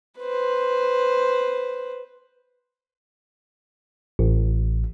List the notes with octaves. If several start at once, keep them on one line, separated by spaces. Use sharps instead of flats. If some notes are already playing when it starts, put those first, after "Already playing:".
B4 C5
A1